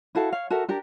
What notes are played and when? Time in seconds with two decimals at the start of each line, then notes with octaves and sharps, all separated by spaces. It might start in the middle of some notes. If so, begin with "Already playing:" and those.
0.15 E4 F#4 A4 F5
0.32 C#5 F5
0.50 F#4 A4 A#4 E5
0.68 D4 G4 A#4